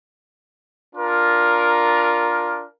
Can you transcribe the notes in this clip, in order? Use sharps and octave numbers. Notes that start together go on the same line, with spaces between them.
D4 F4 A#4